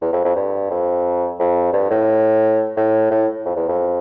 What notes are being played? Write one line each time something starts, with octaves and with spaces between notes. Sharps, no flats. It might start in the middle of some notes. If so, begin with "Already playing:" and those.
E2
F2
F2
G2
F2
F2
G2
A2
A2
A2
F2
E2
F2